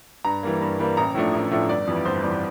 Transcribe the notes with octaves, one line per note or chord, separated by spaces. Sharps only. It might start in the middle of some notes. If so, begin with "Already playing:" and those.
G2 A#5
E3 G3 A#3
G2
E3 G3 A#3
A1 A#5
A2 F3 A3 D4
A1
A2 F3 A3 D4
G1 D5
F2 E3 G3
G1 C5
F2 E3 G3